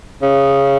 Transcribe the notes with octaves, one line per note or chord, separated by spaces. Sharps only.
C#3